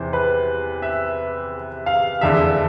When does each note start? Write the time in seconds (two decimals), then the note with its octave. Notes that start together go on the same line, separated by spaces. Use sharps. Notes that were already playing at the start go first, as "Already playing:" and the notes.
Already playing: E2 C3 E3 C5
0.13 B4
0.82 E5
1.86 F5
2.21 F1 E2 D3 E5